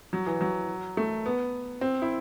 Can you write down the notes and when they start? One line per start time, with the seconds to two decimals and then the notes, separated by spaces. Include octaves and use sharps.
0.13 F#3
0.26 E3
0.41 F#3
0.97 A3
1.26 B3
1.81 C4
2.02 E4